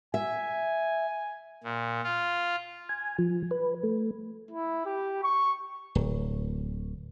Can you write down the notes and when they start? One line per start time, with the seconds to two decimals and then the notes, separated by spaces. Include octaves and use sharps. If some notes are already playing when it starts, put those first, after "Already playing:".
0.14 E5 G#5
1.64 A#2
2.04 F4
2.89 G#5
3.19 F3
3.51 B4
3.83 A3
4.51 E4
4.86 G4
5.24 C#6
5.95 D1